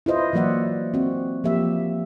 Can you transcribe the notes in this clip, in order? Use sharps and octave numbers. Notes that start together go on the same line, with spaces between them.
E4 F4 B4 C5 D#5
E3 F#3 A#3 D5 E5 F#5
C4 F#4
F3 A#3 G4 E5